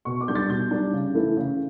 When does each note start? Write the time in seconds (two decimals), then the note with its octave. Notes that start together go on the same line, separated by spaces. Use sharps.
0.05 B2 C#6
0.21 D6
0.28 G3 D4 G6
0.35 A6
0.49 B2 G6
0.71 G3 D4
0.93 C#3
1.14 E3 A3 E4
1.37 C#3